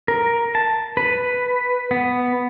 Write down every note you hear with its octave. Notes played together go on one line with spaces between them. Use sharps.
A#4
A5
B4
B3